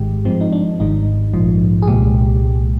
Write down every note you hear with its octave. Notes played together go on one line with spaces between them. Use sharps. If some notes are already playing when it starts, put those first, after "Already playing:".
Already playing: G#1 G#2 D#3 G#3 G4
G2 F3 G#3 C4
D#4
D4
G#1 G#2 D#3 G3 D#4
A#1 G#2 F3
G#4
C2 A#2 G#3 G4